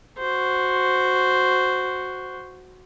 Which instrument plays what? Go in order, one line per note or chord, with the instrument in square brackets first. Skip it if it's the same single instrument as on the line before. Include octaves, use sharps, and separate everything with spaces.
[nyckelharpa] F#4 C5